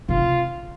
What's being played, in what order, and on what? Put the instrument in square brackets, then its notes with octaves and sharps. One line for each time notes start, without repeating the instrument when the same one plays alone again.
[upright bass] C3 [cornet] F4